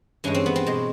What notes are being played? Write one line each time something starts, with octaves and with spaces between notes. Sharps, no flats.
G2 E3 G#3 C#4
C4
B3
C4
B2 G#3